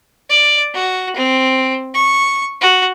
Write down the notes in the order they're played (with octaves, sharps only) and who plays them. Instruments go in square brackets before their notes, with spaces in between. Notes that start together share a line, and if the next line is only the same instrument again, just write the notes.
[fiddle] D5
F#4
C4
C#6
F#4